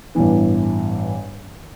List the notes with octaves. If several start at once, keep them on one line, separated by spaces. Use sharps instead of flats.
A1 G2 E3 B3